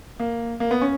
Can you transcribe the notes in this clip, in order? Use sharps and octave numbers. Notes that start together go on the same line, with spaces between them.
A#3
A#3
B3
C#4